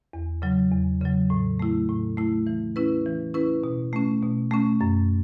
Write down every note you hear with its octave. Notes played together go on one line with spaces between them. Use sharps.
E2
C#3 F#3
E2
C#3 F#3
A2
A3 E4
A2
A3 E4
E3
C#4 E4 B4
E3
C#4 E4 B4
B2
A3 C#4
B2
A3 C#4
F#2